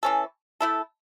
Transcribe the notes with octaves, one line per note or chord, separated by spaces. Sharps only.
E3 C#4 A4
A3 E4 A4